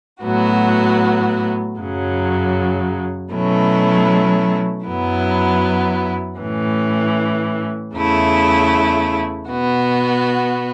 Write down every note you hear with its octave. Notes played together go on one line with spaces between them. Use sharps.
A2 F#3 B3 F#4
F#2 C#3 F#3
B2 F#3 A3 C#4 E4
F#2 F#3 B3 E4
A2 E3 C#4
E2 C#3 A3 E4
B2 B3 F#4